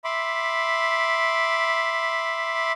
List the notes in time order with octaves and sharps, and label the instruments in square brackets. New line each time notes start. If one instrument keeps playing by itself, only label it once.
[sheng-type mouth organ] E5 B5 C6 D6